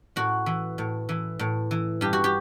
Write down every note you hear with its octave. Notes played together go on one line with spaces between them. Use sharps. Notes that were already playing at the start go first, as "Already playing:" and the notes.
A2 F#4
E3
A2
E3
A2
E3
G2 G4
F#4
G4